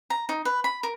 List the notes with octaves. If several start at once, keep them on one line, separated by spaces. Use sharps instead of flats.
A#5
D#4
B4
B5
A#4